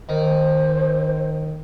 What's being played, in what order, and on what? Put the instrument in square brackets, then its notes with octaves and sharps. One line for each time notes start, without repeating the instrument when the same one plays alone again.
[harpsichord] D#3 [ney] C5